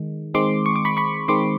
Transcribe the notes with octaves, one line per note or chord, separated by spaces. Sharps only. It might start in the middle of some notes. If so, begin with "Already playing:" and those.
Already playing: D#3 G#3
D#3 G#3 C4 C6 D6
C#6
D6
B5 C#6
B5 C#6
D#3 G#3 C4 C6 D6